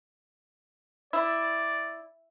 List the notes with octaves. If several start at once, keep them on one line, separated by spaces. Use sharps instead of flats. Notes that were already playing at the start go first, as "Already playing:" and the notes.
E4 D5